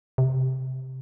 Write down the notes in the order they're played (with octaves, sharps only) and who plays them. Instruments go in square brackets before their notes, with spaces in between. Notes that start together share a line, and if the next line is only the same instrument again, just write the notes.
[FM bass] C3